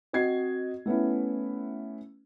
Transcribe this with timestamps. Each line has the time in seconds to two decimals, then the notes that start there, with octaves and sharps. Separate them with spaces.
0.13 C4 F#4 D#5 G#6 C7
0.86 A3 B3 C#4 E4